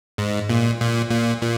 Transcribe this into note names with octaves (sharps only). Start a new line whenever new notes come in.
G#2
A#2
A#2
A#2
A#2